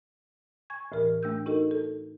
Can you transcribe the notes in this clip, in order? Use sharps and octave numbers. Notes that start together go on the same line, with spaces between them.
G#5 C#6 G#6
D2 A2 E3 A#4 F6
D2 A3 D4 E6 G6
D#4 F#4 A4 A#4 D#5
A4